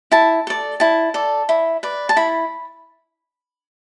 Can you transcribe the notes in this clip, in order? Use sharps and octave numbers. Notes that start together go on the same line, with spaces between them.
E4 A5
A4 D5
E4 A5
A4 D5
E4
B4 D5
A5
E4 B5